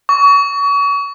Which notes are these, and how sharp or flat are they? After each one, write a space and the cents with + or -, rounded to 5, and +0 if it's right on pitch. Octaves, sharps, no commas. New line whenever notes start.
C#6 +35